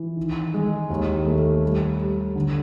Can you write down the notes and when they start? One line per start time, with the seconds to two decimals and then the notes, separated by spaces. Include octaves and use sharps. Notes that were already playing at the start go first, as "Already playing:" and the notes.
Already playing: E3
0.17 D#3
0.54 G#3
0.90 D#2
1.26 A3
1.63 G3
1.99 G3
2.35 D3